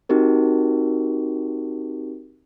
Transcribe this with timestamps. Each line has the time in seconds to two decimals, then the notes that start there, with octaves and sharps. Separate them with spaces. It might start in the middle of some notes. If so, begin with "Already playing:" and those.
0.09 C4 D#4 F#4 G4 A#4